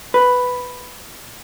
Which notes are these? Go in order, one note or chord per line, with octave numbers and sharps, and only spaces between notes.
B4